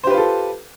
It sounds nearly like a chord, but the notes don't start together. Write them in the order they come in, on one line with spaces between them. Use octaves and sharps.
C5 G4 B4 F4 A4